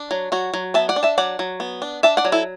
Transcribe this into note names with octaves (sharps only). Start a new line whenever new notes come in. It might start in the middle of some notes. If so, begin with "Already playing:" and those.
Already playing: D4
F#3
F#3 F#4
F#3
B3 E5 A5
D5 F#5
D4
E5 A5
F#3 D5 F#5
F#3
B3
D4
D4 E5 A5
D5 F#5
F#3
E4 A4